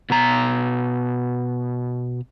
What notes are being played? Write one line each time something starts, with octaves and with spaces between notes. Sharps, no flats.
B2 A#5